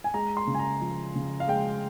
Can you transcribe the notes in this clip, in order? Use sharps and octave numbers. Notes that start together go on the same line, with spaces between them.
G#5
G#3 A#5
C6
C#3
G#5
A#5
F3
C#3
F5
G#3 G5